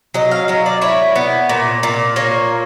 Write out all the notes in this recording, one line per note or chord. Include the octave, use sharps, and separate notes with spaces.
F#3 D#5
F5
F#3 D#5
D5
E4 C#5
B3
A#2
A#2
A#3 C#5